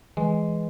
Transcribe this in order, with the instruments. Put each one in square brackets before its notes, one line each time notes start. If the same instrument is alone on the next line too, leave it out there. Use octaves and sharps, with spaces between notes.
[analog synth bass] E3 [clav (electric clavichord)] G#3